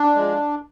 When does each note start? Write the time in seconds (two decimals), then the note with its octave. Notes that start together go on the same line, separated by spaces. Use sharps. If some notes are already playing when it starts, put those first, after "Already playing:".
Already playing: D4
0.15 F3 G#3